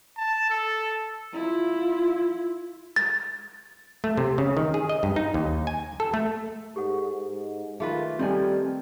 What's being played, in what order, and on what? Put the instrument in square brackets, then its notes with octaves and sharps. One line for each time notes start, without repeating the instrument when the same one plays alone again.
[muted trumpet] A5
A4
[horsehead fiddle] E4 F4
[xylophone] A6
[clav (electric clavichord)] A3
C3
C#3
D#3
G#4
D#5
G2
D#4
D#2
G#5
A4
A3
[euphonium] G#2 [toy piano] G4 A4 F#5
[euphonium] G#2
[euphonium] D#3 [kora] A3 F4 B4 [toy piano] G#4
[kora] D#3 [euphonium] G3 [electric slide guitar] C4 A4 G#5